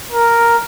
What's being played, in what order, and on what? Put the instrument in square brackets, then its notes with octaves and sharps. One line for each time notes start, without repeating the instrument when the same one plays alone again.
[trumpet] A#4